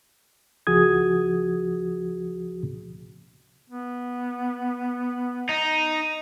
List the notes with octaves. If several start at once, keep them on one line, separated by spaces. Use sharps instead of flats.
C#2 F3 F#4 G#4 D#6 G#6
B3
D#4